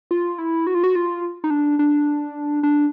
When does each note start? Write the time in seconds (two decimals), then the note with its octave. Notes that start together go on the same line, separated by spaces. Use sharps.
0.11 F4
0.38 E4
0.67 F#4
0.75 F4
0.84 F#4
0.96 F4
1.44 D#4
1.50 D4
1.79 D4
2.63 D4